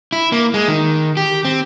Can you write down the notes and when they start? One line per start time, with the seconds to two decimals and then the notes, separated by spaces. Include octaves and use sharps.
0.12 E4
0.32 A#3
0.54 G#3
0.68 D#3
1.17 G4
1.45 C4